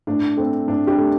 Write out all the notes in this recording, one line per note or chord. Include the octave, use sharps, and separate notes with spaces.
A2 D4
A3 C4
A2 D4
D4 G4
A3